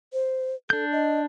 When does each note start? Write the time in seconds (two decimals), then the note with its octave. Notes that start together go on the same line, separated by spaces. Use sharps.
0.13 C5
0.70 D4 A4 G6
0.92 D#5